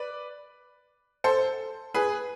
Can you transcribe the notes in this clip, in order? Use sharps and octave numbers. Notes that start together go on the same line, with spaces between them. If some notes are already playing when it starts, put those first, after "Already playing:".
Already playing: B4 D5
A4 C5
G#4 B4